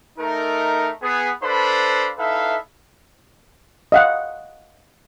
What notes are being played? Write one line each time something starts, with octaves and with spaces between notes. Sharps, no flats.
A3 D#4 A#4
B3 G#4
D4 A4 B4 C5 F5 B5
D#4 E4 A4 B4 E5 F5
D#5 F5 F#5